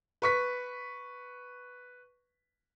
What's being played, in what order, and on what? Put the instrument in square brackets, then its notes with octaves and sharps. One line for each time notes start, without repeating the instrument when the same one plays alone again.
[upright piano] B4 C#6 B6